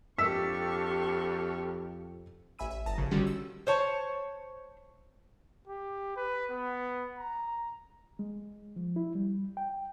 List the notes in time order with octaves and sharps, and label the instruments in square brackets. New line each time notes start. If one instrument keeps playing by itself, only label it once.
[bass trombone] F2 [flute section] D4 A4 F6 [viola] G4 C#6 [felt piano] E6 B6
[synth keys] A1 E5 G#5 B5 E6 D#7
E5
G1 A5 A#5 D#6 A#6
A#1 C#3
D3 D#3 G3 C#4 F#4 G4
E6
[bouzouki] C5 C#5 A5
[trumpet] G4
B4
B3
A#5
[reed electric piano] G#3
F3
E4
G3
G5